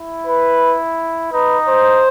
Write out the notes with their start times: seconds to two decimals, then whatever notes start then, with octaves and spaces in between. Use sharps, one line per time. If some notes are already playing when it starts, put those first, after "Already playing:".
Already playing: E4
0.27 B4
1.33 D#4 B4
1.69 C5